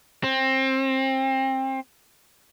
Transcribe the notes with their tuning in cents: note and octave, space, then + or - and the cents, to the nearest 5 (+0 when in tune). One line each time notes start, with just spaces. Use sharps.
C4 +25